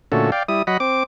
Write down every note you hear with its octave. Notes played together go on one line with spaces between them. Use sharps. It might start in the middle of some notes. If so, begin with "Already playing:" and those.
A#2 D3 A3 C#4 F#4 A4
D5 F5 G5
G3 E4 D#6
F#3 D#5 F#5 B5
C4 D6